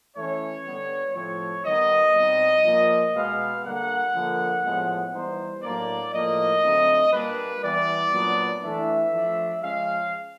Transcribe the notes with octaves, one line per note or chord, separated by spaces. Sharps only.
E3 A3 C#4 C#5
D3 G3 B3
A2 F3 A3 C4 C#5
D#3 G3 B3 D#4 D#5
B2 G3 C4 D#4
A#2 F3 A#3
B2 G#3 B3 F5
D3 G3 A#3 F#5
D3 F3 A#3
A2 F3 G#3 B3
E3 G3 B3 D#4 C5
A2 F#3 A#3 D4 D5
A2 F3 A#3 D#5
D3 F#3 A3 C4 D#4
A#2 G3 A#3 D4 B4
E3 G3 B3 D5
A#2 F#3 B3 D4
E3 A3 D4 E5
F3 A3 D4
F3 G#3 C#4 F5